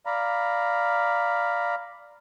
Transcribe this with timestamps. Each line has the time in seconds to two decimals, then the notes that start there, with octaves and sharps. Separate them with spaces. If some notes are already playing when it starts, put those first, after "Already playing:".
0.06 D5 F5 A#5 B5